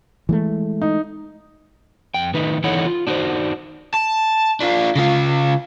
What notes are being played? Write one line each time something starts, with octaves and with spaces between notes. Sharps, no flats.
E3 G#3 A3
D#4
F2 G5
A2 D#3 D#4 B4
E3 D#4 E4 A4 C#5 F#5
F4
D4 D#4 F#4 G#4 C5
A5
D4 F4
C#3 F4